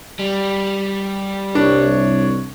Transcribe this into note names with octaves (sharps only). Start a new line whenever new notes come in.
G3
C2 D4 C#5